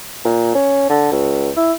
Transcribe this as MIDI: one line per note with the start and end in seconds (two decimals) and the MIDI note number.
0.25 0.54 46
0.55 0.85 61
0.89 1.10 50
1.12 1.50 37
1.57 1.72 64